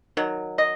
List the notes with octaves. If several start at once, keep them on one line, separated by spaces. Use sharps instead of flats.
D#3 F#3
D#5